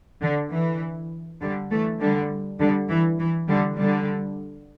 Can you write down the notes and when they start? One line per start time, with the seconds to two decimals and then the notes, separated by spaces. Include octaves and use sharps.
0.22 D3
0.52 E3
1.41 D3 G3
1.71 E3 A3
2.00 D3 G3
2.60 D3 G3
2.89 E3
3.19 E3
3.49 D3 G3
3.78 D3 G3